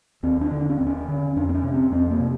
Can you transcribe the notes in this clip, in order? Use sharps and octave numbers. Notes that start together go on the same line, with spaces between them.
D#2 C4
D4
D3
D4
C#4
D#2 C4
C#4
D3
F2 D4
C4
C#4
C3
C4
F2 C4
A#3
C3